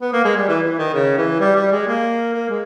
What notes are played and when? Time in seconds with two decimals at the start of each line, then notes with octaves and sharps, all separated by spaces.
0.01 B3
0.13 A#3
0.25 G#3
0.36 G3
0.48 E3
0.63 E3
0.79 D#3
0.94 C#3
1.17 E3
1.40 G3
1.56 G3
1.72 G#3
1.87 A#3
2.33 A#3
2.49 G#3